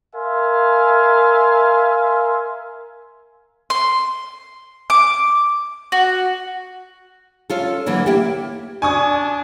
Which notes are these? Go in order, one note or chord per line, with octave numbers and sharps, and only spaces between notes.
A#4 E5 F5 G#5 C6
C6
D6
F#4
C#4 F4 A4
D3 E3 F#3 A#3
A#3 E4 G4
D4 G#5 C#6 D#6